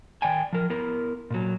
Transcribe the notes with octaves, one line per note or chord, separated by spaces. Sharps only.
D#3 D5 G5 G#5
F3 A#4
B3 E4 A#4
A#2 F#3